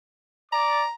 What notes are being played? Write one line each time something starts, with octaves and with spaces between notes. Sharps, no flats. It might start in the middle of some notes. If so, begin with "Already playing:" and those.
D5 A#5 D6